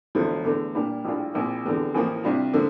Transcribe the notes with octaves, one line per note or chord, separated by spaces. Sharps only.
E1 D2 D3 F3
E2 D3 A3
A#2 G3 A#3 D4 G4
A#1 A2 G3 D4 F4
A#1 A#2 F3 C4 E4
F1 E2 D3
A1 A2 F3 A#3
C2 C3 G3 D4 F4
D3 F3 A#3